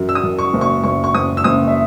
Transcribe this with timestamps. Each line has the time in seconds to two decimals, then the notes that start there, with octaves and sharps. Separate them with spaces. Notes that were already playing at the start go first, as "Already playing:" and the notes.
Already playing: F#2
0.09 E6
0.15 D#6
0.23 F#2
0.39 C#6
0.54 F#1
0.61 C#6
0.84 F#1 C#6
1.04 C#6
1.15 F#1 D#6
1.37 E6
1.44 F#1 D#6
1.68 E5